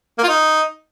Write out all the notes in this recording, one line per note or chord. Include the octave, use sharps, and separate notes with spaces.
A#3
F4
D#4